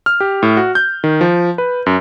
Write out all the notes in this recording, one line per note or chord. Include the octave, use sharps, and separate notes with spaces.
F6
G4
A2
F#4
G6
D#3
F3
B4
F#2